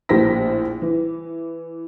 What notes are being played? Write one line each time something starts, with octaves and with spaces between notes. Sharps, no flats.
A#1 A2 G4 C5 A#6 B6
E3